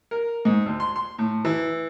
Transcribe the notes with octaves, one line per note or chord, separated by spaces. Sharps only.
A#4
G#2
D2
C6
C6
A2
E3